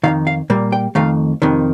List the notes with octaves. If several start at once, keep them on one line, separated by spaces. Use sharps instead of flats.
F2 C3 D#3 F5
F5
A#2 G3 A#3
G5
F2 D#3 A3 F5
F2 C3 D#3